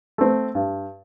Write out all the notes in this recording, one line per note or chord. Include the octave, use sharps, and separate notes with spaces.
A3 C4
G2